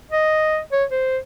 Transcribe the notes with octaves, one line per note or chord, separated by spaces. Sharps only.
D#5
C#5
C5